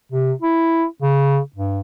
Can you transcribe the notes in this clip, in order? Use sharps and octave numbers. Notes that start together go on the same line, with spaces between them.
C3
E4
C#3
G2